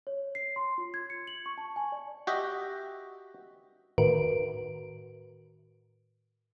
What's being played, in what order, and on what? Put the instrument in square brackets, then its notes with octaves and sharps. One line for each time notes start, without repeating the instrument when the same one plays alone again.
[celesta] C#5
C7
C6
F4
G#6
C#7
F#7
C#6
A5
G#5
D5
[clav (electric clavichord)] F#4 G4 D#5 E5
[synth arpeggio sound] A2 D#3 F#4 A#4 B4 D7